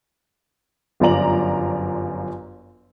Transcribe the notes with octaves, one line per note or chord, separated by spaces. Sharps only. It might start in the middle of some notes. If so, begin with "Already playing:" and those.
G1 F#2 F3 D5 A#5 F#7